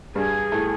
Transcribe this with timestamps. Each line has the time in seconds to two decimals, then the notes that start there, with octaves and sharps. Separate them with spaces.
0.15 G2 G3 G#4
0.52 A2 A3